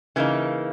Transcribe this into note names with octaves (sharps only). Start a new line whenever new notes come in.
C#3 E3 A#3 D#4